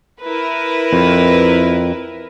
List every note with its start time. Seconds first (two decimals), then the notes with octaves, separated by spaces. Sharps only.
0.22 E4 A#4 B4
0.93 F2